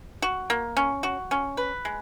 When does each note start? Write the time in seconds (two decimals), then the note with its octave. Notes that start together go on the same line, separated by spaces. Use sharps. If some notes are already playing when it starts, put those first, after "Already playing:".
0.22 F#4
0.50 A#3
0.77 C#4
1.03 F#4
1.31 C#4
1.57 B4
1.85 G#3